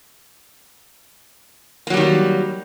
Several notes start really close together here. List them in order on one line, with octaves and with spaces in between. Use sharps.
A#3 F#3 G3 D#3